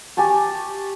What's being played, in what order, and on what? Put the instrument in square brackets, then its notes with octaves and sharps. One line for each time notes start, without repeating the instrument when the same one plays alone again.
[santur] G4 G#5 A5 C#6